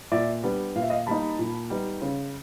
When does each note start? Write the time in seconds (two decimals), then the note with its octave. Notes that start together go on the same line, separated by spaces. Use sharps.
0.12 A#2 D5 E5
0.43 G3 B3 D4
0.75 A#2 F5
0.82 E5
0.90 D#5 F5
1.07 G3 A#3 D#4 A5 B5
1.39 A#2
1.70 G3 B3 D#4
2.02 C#3